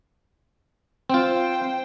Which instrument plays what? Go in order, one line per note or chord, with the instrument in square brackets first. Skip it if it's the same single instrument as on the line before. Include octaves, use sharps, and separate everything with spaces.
[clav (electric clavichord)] C4 F4 [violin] C5 G5